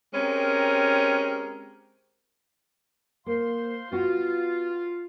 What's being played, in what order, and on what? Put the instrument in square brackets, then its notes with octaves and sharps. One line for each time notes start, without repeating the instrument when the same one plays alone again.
[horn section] G#3 C4 C#4 G4 A#4
[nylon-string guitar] A#3 [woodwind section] C5 F5 C6
[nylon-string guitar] B3 F#4 [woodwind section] F4